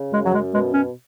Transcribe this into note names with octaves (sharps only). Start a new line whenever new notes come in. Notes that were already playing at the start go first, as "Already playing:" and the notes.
Already playing: C#3
F#2 G#3
F#3
F#2 G#3
B2 G#3
B2 C#4